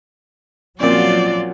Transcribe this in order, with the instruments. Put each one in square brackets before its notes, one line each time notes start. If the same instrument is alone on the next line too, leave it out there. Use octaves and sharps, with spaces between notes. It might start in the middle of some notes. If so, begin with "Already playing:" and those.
[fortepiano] A#2 C4 C#4 [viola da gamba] F3 F4 F#4 [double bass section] F#3 [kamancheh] D5